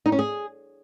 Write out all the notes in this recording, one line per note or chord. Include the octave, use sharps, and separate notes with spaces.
D#4
C#4
G#4